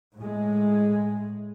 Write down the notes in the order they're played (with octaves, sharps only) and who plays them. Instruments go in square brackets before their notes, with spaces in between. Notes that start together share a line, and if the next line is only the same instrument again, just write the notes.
[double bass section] A2 G#3